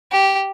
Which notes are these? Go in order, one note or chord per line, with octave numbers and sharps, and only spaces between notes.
G4